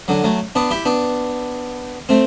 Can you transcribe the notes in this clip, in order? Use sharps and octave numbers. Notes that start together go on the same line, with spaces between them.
D3 F#3
F#3 A3
B3 D4
E4 G4
B3 D4
A3 C4